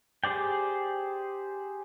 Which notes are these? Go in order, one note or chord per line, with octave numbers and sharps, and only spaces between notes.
G4 G#4 C5 D5 G5